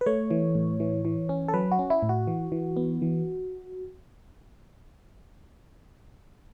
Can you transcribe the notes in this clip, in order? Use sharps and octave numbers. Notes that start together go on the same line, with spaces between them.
B4
A3 C#5
E3
A2
E3
E3
C#4
A4
F#3 B4
F#4
C#4
E4
A2
F#4
E3
E3
B3
E3